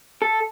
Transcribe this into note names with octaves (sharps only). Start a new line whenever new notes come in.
A4